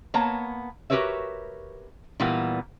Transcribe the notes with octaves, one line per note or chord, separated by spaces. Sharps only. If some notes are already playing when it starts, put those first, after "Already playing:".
A#3 B3 C#5 A5 A#5
F#4 G4 A#4 B4 C#5 E5
A#2 E3 G3 A#3 B3